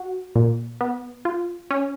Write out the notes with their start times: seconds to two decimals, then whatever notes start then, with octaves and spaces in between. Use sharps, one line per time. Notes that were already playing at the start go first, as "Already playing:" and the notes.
Already playing: F#4
0.36 A#2
0.81 B3
1.25 F4
1.71 C#4